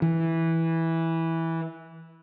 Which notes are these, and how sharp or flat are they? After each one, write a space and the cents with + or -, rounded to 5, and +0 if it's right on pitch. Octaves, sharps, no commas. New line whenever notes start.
E3 -10